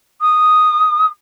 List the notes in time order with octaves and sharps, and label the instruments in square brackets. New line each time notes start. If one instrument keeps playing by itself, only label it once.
[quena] D#6